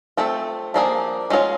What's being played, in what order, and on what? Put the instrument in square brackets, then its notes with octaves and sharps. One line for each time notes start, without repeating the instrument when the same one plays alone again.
[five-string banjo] A3 C4 F4 A4
F3 A#3 D4 F4 G#4
G#3 C#4 F4 G#4 C#5